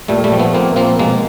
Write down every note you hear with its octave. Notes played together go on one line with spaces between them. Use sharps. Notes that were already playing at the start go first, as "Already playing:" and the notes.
A#2 G3 A3
G3 A3
F3
A3 B3
A#2 A#3 C4
F3 A#3 C4
B2 G#3 A#3